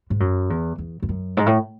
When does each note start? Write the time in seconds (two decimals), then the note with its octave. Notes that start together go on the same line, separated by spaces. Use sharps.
0.10 G#2
0.20 F#2
0.50 E2
0.78 E2
1.02 E2
1.09 F#2
1.37 G#2
1.46 A2